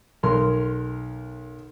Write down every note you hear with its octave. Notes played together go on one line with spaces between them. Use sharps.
B1 A#4 C6